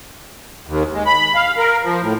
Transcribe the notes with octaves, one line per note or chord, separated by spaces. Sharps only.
D#2
G#3
B5
F5
A#4
F3
A2